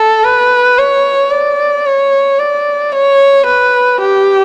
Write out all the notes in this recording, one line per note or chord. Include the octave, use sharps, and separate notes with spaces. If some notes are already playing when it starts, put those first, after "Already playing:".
Already playing: A4
B4
C#5
D5
C#5
D5
C#5
B4
G4